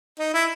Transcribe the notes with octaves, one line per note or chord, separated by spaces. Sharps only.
D#4
E4